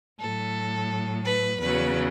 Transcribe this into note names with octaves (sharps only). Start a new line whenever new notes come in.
A2 F#3 A4
B4
E2 C#3 F#3 B4